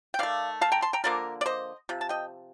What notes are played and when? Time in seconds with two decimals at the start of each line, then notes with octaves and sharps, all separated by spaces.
0.14 G5
0.19 D#3 A3 D5 F5
0.61 F5 A5
0.72 G5 A#5
0.82 A5 C6
0.93 G5 A#5
1.04 D3 F3 A#3 A#4 D5
1.41 D5
1.46 C5 D#5
1.89 C3 F3
2.01 A5
2.09 D#5 G5